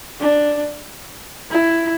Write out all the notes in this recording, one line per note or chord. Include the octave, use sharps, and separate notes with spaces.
D4
E4